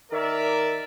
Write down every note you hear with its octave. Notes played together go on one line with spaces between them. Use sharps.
D#3 A#4 D5 E5